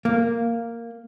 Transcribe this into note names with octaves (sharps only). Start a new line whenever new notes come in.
A#3